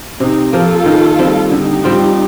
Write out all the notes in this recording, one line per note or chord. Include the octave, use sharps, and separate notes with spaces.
C3 C4 D#4
F3 A#3 F4 A4
D#3
G3 C4
D3 D#4 G4
G3 C4 F4